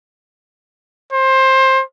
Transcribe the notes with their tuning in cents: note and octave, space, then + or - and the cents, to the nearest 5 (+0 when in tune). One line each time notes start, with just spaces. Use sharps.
C5 +20